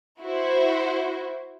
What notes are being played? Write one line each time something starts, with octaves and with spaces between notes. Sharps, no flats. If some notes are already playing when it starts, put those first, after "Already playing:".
E4 F#4 C5